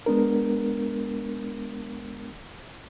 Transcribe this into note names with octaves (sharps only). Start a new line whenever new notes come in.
G#3 B3 D4 A#4